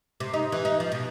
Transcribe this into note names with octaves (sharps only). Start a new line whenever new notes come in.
C3
D#4
E3
D#4
F3
B2